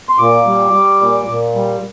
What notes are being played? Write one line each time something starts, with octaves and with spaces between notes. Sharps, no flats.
C6
A#2 D6
G3
G3
A#2
A#2
G3